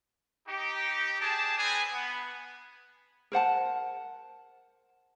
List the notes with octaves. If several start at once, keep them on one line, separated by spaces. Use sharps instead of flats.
D#4 G4
D4 G4 G#4 A5
C4 D4 G#4 B4 G#5
B3
A#4 C5 F#5 A5